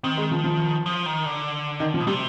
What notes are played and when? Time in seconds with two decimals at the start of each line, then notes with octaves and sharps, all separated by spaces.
0.03 D#3 C4
0.17 G#3
0.31 F3
0.44 F3
0.86 F3
1.06 D#3
1.26 D3
1.80 D#3
1.94 F3
2.00 B2
2.07 C3 G3